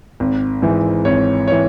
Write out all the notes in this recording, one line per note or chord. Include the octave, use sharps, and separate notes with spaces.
G#1
G#2 E3
G#1 C#5
E3 C#5